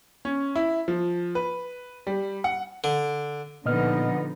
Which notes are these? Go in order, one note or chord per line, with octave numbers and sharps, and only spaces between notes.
C#4
E4
F3
B4
G3
F#5
D3
A#2 D3 F3 B3 D#4 D#5 F6